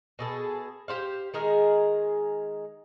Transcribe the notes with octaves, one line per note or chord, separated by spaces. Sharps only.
B2 G#4 A4
G4 C5 F5
D#3 G#3 G#4 A#4